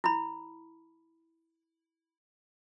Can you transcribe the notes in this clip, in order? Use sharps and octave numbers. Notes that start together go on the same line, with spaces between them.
E4 B5